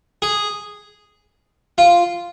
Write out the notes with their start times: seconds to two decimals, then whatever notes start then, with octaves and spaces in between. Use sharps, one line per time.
0.22 G#4
1.78 F4